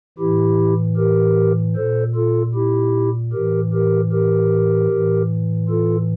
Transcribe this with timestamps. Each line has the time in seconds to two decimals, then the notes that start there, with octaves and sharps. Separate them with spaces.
0.18 A2 E3 E4 G4
0.97 G4 A#4
1.76 A#2 A4 C5
2.15 F4 A4
2.55 E4 G4
3.33 A2 E3 G4 A#4
3.73 G4 A#4
4.12 G4 A#4
4.91 A2 E3
5.69 F4 A4